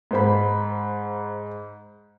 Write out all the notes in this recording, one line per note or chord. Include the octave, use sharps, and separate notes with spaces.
G#2 C5 B5